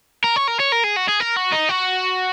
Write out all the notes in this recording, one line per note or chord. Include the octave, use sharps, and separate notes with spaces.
A#4
C#5
A#4
C#5
A#4
G#4
F#4
G#4
A#4
F#4
D#4
F#4